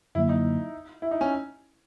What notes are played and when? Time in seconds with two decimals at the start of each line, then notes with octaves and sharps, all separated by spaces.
0.15 F#2 D3 F#3 A#3 E4
0.29 D#4
1.02 E4
1.11 D#4
1.21 C#4